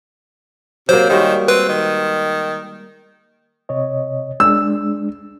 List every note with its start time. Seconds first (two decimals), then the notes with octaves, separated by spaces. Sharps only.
0.89 C3 F#3 A#3 C5
1.10 D#3 G3 G#3 F#4
1.48 C4 B4
1.69 D#3
3.69 C3 C#5 D#5
4.40 G#3 D4 E6